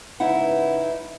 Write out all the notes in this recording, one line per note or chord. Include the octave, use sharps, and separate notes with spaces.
G#2 C#3 D#4 E4 B4 F#5